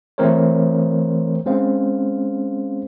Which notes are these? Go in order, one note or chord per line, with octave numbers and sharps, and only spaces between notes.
E3 A3 C4 A#4 C5 C#5
G#3 C4 C#4 C5 F5